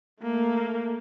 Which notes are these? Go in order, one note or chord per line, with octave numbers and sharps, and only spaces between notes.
A3 A#3